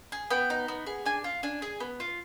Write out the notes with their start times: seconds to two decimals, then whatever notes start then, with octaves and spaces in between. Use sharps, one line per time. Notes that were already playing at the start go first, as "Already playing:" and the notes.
0.12 G#4
0.31 B3 G5
0.50 D#4
0.68 B3
0.87 G#4
1.06 D4 G#5
1.24 F4
1.43 D4 G#5
1.62 G#4
1.80 B3
2.00 F4